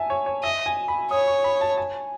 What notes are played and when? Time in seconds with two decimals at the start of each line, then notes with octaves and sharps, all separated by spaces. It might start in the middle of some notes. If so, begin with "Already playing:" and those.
Already playing: E5 G#5 A5
0.10 C#5
0.26 C#5
0.43 D#5 E5
0.66 G#5
0.88 B5
1.11 C#5 D#6
1.28 C#6
1.44 B5
1.61 A5
1.78 G#5